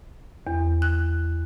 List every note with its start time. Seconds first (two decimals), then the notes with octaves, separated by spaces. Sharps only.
0.47 E2
0.82 F#6